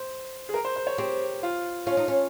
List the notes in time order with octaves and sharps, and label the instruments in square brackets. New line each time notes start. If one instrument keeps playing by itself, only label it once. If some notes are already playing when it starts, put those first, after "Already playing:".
Already playing: [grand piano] C5
G#4
A#4
C5
C5
C#5
[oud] C4 [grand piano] G4
[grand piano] F4
[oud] C#4 [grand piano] F4
[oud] D#4
C#4